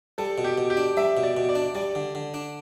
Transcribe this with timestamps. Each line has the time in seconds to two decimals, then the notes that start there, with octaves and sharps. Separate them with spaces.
0.18 G3 A4
0.38 B2
0.44 G4
0.58 B2
0.70 G4
0.77 D4
0.97 G3 E5
1.17 B2
1.23 D5
1.37 B2
1.49 D5
1.55 D4
1.75 G3 D5
1.95 D3
2.15 D3
2.34 D4